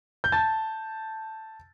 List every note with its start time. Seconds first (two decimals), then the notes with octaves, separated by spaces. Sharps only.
0.24 G6
0.32 A5 A6